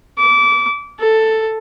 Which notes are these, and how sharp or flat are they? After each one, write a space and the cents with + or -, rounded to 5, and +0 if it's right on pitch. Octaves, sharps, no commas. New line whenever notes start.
D6 -25
A4 +5